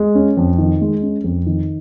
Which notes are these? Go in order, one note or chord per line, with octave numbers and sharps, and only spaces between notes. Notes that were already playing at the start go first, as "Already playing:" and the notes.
Already playing: G#3
C#4
F2
D#3
G#3
C#4
F2
D#3